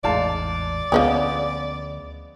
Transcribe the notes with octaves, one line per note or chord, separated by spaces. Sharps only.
A1 E2 G#2 D5 F5 A5
D2 F3 G#3 B3 C#4 G#4